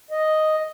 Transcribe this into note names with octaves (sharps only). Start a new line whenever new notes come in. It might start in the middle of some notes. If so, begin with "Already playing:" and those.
D#5